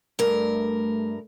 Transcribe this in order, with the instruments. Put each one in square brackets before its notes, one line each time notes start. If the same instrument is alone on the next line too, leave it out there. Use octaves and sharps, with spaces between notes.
[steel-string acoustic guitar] G2 A#4 [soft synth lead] A3